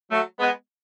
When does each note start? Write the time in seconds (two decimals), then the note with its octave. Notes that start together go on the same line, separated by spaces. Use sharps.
0.10 F#3 A3
0.40 G#3 B3